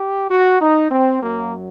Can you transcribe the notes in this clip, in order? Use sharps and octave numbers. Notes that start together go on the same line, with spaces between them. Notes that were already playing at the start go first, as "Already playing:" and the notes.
Already playing: G4
F#4
D#4
C4
F#2 F#3 A#3